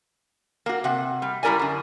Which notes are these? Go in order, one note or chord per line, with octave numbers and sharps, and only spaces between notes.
A#3 F#4
C3 F#5
G3
F#2 G3 E4 A#4 D5 G#5
F#2 D3